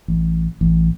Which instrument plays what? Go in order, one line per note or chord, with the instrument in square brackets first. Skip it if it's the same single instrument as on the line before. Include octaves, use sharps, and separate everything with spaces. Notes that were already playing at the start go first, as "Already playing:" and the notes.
[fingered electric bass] A1
A1